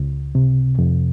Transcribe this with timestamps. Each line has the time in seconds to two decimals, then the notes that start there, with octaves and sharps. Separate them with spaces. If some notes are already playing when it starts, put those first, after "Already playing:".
Already playing: C#2
0.35 C3
0.79 F2